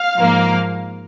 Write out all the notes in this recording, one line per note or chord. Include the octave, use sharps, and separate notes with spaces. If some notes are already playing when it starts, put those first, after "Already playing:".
Already playing: F5
G#2 F3 A#3